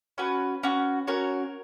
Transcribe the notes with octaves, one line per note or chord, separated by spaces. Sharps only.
C#4 F#4 B4
C#4 F#4
C#4 F#4 A#4 C#5